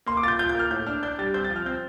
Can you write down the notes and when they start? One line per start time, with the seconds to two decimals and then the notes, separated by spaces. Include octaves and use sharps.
0.07 A#3 C6
0.17 D6
0.23 F4 A6
0.28 G6
0.39 F4 G6
0.49 G6
0.55 A#3 F6
0.71 A2 G6
0.86 D4 F6
1.03 D4 G6
1.19 G3 A6
1.34 C4 G6
1.44 A6
1.50 F3
1.56 F6
1.66 C4 G6